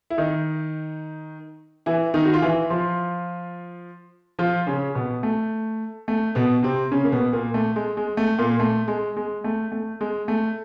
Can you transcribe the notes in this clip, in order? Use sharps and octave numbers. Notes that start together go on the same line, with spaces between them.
E4
D#3 D#4
E3 E4
D#3 D#4
F#4
F4
E3 E4
F3 F4
F3 F4
C#3 C#4
B2 B3
A3
A3
B2 B3
C3 C4
C#3 C#4
A#3
B2 B3
A#2 A#3
A3
G#3
G#3
A3
A#2 A#3
A3
G#3
G#3
A3
A3
G#3
A3